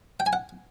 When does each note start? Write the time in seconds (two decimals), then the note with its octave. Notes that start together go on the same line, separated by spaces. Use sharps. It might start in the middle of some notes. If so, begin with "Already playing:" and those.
0.20 G5
0.26 G#5
0.33 F#5